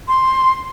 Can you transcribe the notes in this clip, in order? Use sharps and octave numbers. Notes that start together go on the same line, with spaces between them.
C6